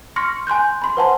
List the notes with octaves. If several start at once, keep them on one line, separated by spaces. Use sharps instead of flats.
C6 C#6 F6 A#6 C#7
G#5 C6 F#6 G6
B5 C6
B4 C5 F#5 G#5 A5 C6